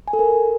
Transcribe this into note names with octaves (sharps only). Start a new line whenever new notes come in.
G#5
A4
A#4